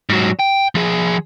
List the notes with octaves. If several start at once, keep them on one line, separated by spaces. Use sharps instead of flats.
G#2 F#3
G5
F3 G#4